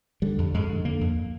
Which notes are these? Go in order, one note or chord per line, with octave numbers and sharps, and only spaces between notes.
D3 G3
F2
F2 G#3
D3
D3 A#3
F2